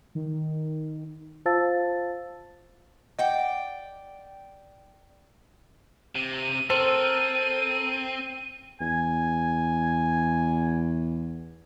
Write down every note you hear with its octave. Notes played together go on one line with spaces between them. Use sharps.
D#3
F4 C5 F5 A5 E6 A6
D5 D#5 F#5 G5
C3 D#7
C4 A4 A#4 C5
E2 G#5